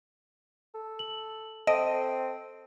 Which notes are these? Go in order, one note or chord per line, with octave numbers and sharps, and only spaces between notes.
A4
F#7
C4 A4 D#5 A5 D7